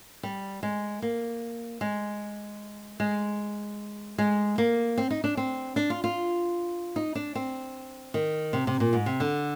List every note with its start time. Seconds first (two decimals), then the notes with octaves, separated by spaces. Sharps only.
0.23 G3
0.63 G#3
1.02 A#3
1.81 G#3
3.00 G#3
4.18 G#3
4.58 A#3
4.98 C4
5.11 D#4
5.24 D4
5.37 C4
5.76 D4
5.90 F4
6.04 F4
6.96 D#4
7.15 D4
7.35 C4
8.14 D#3
8.53 C3
8.67 C3
8.80 A#2
8.93 G#2
9.06 C3
9.20 D3